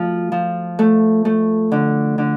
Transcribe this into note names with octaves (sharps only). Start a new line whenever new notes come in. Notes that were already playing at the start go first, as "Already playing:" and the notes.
Already playing: F3 A3
F3
A3
A3
D3
D3